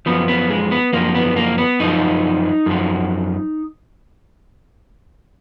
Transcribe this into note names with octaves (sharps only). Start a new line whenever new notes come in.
F#2 F3 B3
B3
G#3
B3
F#2 F3 A#3
B3
A#3
B3
F#2 F3 D#4
F#2 F3